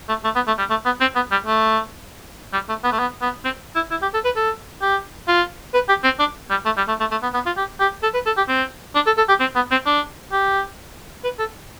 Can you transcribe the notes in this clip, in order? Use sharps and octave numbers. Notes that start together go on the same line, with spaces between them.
A3
A3
B3
A3
G3
A3
B3
C4
B3
G3
A3
G3
A3
B3
A3
B3
B3
C4
E4
E4
G4
A4
B4
A4
G4
F4
B4
G4
C4
D4
G3
A3
G3
A3
A3
A3
B3
B3
F4
G4
G4
A4
B4
A4
G4
C4
D4
A4
A4
G4
C4
B3
C4
D4
G4
B4
A4